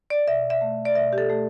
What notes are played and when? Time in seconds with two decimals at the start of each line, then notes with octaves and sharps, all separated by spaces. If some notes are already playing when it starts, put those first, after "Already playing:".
0.10 D5
0.27 B2 E5
0.50 E5
0.61 A3
0.85 D5
0.95 B2 E5
1.13 G4
1.18 A4
1.30 A3